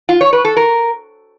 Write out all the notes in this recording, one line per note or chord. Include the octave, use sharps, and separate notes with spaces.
F4
C#5
B4
A4
A#4